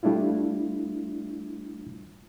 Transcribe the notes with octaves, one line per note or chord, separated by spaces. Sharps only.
G3 A3 D4 E4 F4